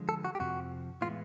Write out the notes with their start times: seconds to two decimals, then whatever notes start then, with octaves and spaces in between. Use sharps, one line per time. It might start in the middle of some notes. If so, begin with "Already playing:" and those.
Already playing: D3 F3 G#3
0.09 A4
0.25 F#4
0.35 G4
0.40 F2 C3 F3 F#4
1.01 A2 E3 G#3 B3 F4